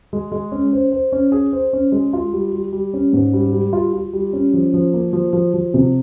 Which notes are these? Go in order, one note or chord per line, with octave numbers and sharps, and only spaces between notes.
G#3
G#3
C#4
C5
C5
C#4
G#4
C5
C#4
G#3
F4
G3
G3
G3
C#4
G#2
G3
G3
F4
F4
G3
C#4
F3
F3
A#3
F3
F3
F3
C3